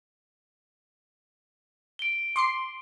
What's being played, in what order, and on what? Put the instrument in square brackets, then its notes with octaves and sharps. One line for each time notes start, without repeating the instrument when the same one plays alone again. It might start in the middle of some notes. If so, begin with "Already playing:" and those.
[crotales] D7 G7
[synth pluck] C6 D6 C7